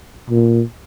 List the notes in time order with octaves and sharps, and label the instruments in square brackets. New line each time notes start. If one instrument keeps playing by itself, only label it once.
[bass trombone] A#2